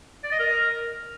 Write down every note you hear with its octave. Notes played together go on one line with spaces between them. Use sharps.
D5
D#5
A#4